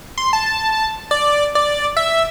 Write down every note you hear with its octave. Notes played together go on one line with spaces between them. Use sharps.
C6
A5
D5
D5
E5